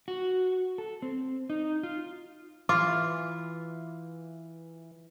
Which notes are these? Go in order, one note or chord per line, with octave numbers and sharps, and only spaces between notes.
F#4
A4
C4
D#4
F4
E3 F4 D6